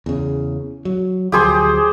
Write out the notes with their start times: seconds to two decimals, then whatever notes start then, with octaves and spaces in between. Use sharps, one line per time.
0.06 E2 C#3
0.85 F#3
1.32 D2 F3 F#3 G4 G#4 C5